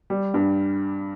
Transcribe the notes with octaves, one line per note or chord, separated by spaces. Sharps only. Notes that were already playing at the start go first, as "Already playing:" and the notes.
G3
G2